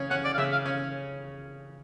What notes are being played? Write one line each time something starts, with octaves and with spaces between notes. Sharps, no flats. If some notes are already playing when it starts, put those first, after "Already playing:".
Already playing: C#3 C#4
C#4 F#5
D5
F5
C#3 E5
F5
C#4